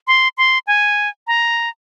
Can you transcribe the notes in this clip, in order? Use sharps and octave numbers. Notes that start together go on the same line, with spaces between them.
C6
C6
G#5
A#5